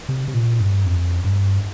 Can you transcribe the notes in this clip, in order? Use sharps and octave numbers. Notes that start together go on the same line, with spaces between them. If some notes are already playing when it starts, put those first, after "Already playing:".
C3
C3
A#2
G2
F2
G2